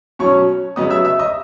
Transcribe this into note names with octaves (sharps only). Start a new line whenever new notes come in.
B2 F#3 C#4 C#5 C#6
C#3 F#3 B3 D#5 D#6
E5 E6
E5 E6
D#5 D#6